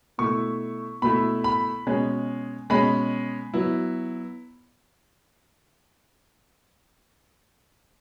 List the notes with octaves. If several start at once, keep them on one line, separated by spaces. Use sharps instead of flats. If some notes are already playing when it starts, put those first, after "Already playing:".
B2 A3 E4 C#6
B2 A3 E4 B5
B5
B2 G#3 C#4
B2 G#3 C#4 B5
F#3 B3 E4